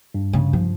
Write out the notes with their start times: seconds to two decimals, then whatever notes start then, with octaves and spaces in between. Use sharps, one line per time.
0.14 G2
0.33 C#3
0.53 F3